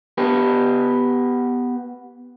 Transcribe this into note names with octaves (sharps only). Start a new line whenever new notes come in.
B3 G4 B4